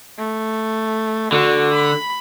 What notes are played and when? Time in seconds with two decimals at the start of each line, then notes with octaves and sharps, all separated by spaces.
0.19 A3
1.32 D3 F#4
1.74 B5